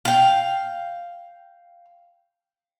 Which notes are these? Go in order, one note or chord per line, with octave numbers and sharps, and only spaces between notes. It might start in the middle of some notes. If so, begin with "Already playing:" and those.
F5 G5